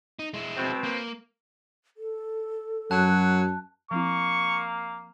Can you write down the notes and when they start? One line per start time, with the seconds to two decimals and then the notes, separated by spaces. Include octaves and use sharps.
0.19 D#4
0.34 G#3 E4
0.56 B2 C4
0.84 A#3
1.97 A4
2.91 F#2 F#3 A5 F#6
3.91 F3 A#3 C4 E4 C#6